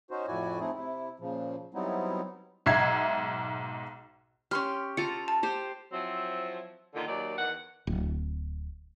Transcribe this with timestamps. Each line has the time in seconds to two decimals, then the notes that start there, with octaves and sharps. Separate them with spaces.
0.11 C#4 D#4 F#4 C5
0.27 F2 A2 E4 F#4 D5 G#5
0.59 A3 C4 D#4 E4 G#4
0.74 C3 E4
1.20 A#2 C#3 F3
1.74 F#3 G3 B3 C4 D#4 E4
2.66 B1 G#2 E5 G#6 C7
4.51 C#4 G4 C6 F6
4.97 F4 A4 A#5 C#7
5.28 A5
5.43 G4 C5
5.92 F3 F#3 C4 E4
6.95 A#2 D3 D#3
7.07 D#2 D#3 F#3 D5
7.36 E2 D#3 F#5
7.87 D1